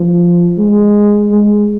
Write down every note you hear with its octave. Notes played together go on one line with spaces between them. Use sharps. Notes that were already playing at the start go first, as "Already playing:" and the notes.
Already playing: F3
G#3
G#3